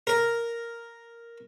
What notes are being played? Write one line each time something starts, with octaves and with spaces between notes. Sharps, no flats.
A#4